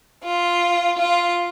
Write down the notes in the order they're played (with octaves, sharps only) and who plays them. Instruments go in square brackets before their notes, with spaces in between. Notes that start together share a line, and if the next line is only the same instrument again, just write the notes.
[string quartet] F4
F4